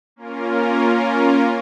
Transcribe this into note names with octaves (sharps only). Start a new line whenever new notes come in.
A#3 C#4 F4 A#4